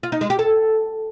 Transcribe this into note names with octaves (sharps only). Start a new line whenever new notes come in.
F4
D#4
G#3
G4
A4